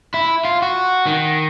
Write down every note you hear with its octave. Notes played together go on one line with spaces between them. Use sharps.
E4
F4
F#4
D#3